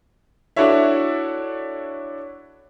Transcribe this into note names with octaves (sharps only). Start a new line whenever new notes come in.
D4 E4 F#4 A4 C#5 E5